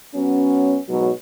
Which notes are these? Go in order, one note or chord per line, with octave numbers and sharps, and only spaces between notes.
F#3 B3 C#4
G#2 B2 F#3